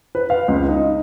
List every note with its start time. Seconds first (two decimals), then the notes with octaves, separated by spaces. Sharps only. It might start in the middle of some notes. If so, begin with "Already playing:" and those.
0.15 B4
0.30 F5
0.48 C#2
0.68 D#4